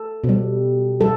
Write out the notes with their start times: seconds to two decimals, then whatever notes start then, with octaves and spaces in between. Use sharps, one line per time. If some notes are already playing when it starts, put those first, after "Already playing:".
Already playing: A4
0.24 B2
0.29 G3
1.00 G3 A4